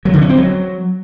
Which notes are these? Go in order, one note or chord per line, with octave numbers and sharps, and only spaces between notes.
F#3
D3
C#4
C4
F#3